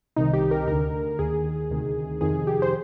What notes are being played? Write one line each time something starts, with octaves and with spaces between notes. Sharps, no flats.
C2 C3 D#3 D#4
G4
A#4
D2 D3 A#4
D#2 D#3 G#4
D2 C3 D#3
F2 C3 D#3 G#4
G4
C5